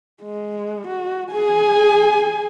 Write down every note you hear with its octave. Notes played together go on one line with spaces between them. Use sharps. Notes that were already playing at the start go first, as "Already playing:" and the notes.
G#3
F#4
G#4 G#5